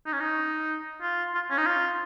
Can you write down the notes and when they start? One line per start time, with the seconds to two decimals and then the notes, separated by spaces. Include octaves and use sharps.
0.06 D#4
0.13 C#4
0.20 D#4
1.02 F4
1.35 F4
1.50 C#4
1.58 D#4
1.66 F4